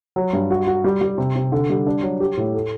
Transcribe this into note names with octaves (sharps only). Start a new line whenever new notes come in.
F#3
G2
F#4
F#4
G3
G3
C3
C3
D3
G3
D4
F#3
G4
A2
A3